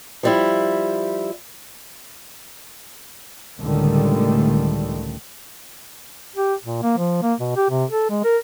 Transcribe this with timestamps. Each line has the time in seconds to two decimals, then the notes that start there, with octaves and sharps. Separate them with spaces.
0.23 F3 G3 E4
3.60 C#2 A2 D3 D#3 G3
6.36 G4
6.64 A#2
6.83 A#3
6.98 F3
7.23 A#3
7.40 B2
7.56 G4
7.70 C3
7.90 A4
8.10 G#3
8.24 A#4